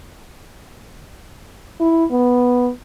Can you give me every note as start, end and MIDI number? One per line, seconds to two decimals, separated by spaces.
1.80 2.05 64
2.11 2.70 59